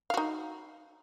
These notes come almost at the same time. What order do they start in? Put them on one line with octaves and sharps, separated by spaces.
F5 F#4 D#4